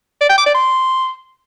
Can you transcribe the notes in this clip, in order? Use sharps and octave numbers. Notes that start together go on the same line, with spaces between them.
D5
G5
D6
D5
C6